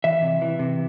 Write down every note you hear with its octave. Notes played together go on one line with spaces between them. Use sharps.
E3 E5
C3
E3
C3